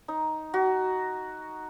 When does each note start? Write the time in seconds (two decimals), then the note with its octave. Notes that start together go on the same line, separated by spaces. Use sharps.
0.08 D#4
0.54 F#4